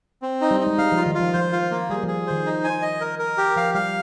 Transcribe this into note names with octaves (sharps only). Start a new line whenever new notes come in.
C4
D#4
G3
D#4
G#3
G3 F5
F3
F4
D#3
F4
F3
F3 C5
F4
A#3
G3 G#4
F3 G#4
D#3 C5
D#4
G#5
D#5
A#4
A#4
G4
F3 F5
G3 F5